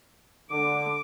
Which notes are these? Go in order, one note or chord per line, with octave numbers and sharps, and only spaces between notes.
D3 D6